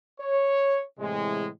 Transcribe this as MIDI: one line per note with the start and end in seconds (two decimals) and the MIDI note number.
0.21 0.82 73
0.99 1.48 45
0.99 1.48 48
0.99 1.48 52
0.99 1.48 56